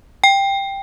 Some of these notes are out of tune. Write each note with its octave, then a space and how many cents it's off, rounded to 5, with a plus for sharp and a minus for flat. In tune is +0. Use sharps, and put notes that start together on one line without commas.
G5 +10